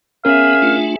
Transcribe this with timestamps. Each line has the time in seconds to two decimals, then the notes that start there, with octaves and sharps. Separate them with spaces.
0.25 B3 C#4 G#4 A#4 E5 F5
0.62 A3 D4 F4